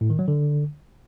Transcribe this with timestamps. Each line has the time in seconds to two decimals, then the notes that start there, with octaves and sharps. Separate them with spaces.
0.01 A2
0.10 D#3
0.19 F#3
0.28 D3